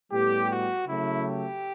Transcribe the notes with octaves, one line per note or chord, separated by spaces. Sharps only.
A2 G3 B3 G4
F#4
C#3 F#3 A3 E4
G4